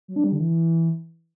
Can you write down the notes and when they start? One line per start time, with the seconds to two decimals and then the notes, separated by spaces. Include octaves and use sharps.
0.08 F#3
0.16 D4
0.24 G3
0.32 D3
0.40 E3